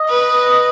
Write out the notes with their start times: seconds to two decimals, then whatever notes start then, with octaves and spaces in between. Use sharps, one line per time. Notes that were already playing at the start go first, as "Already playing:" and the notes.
Already playing: D#5
0.09 B4